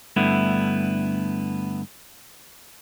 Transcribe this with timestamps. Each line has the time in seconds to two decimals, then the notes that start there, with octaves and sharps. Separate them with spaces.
0.16 G2 D3 A3 B3 E4